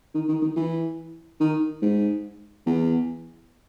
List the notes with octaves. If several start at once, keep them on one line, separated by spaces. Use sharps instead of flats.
D#3
D#3
D#3
E3
D#3
G#2
E2